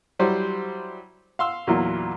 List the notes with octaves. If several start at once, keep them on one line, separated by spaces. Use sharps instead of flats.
F#3 G3 E4 C5
F5 C6 E6
E2 A#2 F#3 E4 F4